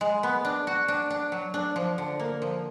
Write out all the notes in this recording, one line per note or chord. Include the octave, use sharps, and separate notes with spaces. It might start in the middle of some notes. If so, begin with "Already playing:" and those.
G#3
B3
D4
F#4
D4
D4
F#3
D4
F3
D3
A#3
F3